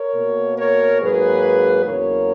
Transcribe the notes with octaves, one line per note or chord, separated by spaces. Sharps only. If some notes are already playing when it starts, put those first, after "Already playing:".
Already playing: A#4 C#5
B2 A#3
A#4 C#5
G#2 F#3 A#3 G#4 B4
E2 C#3 F#3 A#3 A#4 C#5